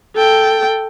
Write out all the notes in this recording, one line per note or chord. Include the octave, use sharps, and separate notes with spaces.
A4 G5